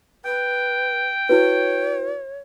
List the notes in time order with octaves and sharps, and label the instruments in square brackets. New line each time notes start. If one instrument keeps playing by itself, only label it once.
[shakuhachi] B4 [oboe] G5
[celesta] E4 F#4 B4 [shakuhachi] C#5